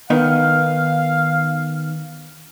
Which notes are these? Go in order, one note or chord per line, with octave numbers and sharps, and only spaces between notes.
D#3 B3 D#4 F5